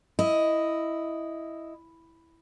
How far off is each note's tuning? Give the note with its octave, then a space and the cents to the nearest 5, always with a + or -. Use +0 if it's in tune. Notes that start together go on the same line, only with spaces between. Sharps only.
E4 +0 D#5 +0